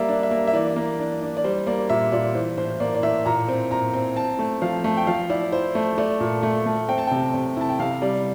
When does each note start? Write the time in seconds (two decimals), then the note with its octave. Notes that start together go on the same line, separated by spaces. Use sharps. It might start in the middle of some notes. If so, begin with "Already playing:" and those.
Already playing: G3 A#3 D5 E5
0.08 D4
0.23 E5
0.31 A#3
0.47 E5
0.53 E3 D5
0.76 A#3
0.99 D4
1.22 D4
1.37 D5
1.44 G3 C5
1.67 A#3 D5
1.89 A#2 E5
2.12 A#2 D5
2.35 E3 C5
2.57 A2 C5
2.80 A#3 D5
2.95 D5
3.03 A2 E5
3.26 A#2 A#5
3.48 C4
3.71 A#2 A#5
3.93 C4
4.16 C4 A5
4.39 A3
4.62 F3 F5
4.84 A3
4.97 G5
5.07 F3 F5
5.29 E4 D5
5.52 E4 C5
5.75 A3 C5
5.98 A3 D5
6.20 A#2
6.43 A3
6.66 A3
6.88 C4 G5
6.98 A5
7.07 C3 G5
7.34 C3
7.57 E4 A5
7.70 G5
7.79 C3 F5
8.02 G3 D5